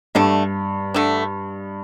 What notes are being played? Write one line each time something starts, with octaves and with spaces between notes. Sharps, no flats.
G2 D3 A3 D4
D3 A3 D4